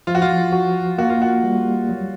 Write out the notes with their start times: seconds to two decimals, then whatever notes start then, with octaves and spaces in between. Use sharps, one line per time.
0.07 F3 F4
0.15 F#4
0.22 F4
0.53 F#4
0.98 A#3 F#4
1.10 F4
1.22 F#4
1.44 G3
1.89 F#3